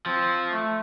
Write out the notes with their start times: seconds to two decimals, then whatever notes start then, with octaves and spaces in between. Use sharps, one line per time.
0.06 F3 C4
0.51 A3